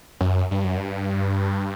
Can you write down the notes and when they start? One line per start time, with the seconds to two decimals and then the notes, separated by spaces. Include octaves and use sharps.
0.20 F#2
0.51 G2
0.64 F#2
0.78 G2